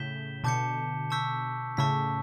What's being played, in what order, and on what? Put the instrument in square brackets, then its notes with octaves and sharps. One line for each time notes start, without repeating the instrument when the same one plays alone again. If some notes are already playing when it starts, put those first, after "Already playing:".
Already playing: [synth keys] A2 C#3 [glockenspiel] G6 B6 E7 G7
[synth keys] B2 D3 [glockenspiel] A5 D6 G6 C#7
[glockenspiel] A5 C#6 E6 G6 B6
[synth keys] A2 C#3 [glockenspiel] A5 C#6 E6 B6